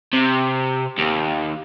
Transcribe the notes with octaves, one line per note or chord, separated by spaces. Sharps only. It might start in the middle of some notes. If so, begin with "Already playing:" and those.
C3
D#2